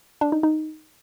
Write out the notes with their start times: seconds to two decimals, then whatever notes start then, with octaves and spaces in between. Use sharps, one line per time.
0.21 D4
0.32 D#4
0.43 D#4